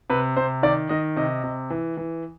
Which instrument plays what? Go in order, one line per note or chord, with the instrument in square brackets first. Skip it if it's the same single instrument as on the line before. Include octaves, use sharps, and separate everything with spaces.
[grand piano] C3 B4
C3 C5
D#3 D5
D#3 D#5
C3 D#5
C3
E3
E3